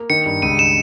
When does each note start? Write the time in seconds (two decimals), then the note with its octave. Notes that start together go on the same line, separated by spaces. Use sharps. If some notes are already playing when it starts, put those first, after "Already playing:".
Already playing: A#3
0.10 D#3 C#7
0.26 G2
0.42 C#2 D#7
0.58 D#4 E7